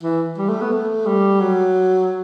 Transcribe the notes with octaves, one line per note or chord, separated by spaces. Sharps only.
E3
G3
A3
B3
A3
G3
F#3